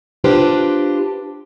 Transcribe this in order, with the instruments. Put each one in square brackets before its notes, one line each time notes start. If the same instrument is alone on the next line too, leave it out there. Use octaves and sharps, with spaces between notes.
[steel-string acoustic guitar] D4 F4 G4 B4 C5